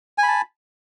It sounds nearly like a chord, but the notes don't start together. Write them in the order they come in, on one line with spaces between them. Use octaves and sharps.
G#5 B5 A5